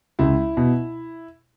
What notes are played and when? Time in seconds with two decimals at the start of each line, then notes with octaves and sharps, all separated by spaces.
0.19 C#2 E4
0.57 B2